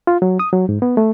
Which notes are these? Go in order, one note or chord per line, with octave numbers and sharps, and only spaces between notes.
F4
F#3
D#6
F#3
G#2
B3
A3